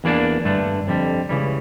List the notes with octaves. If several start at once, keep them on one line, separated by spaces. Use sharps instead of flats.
E2 E3 A#3 D4
G2 D3 A3 D4
F2 D3 G3
C#2 C#3 E3 G3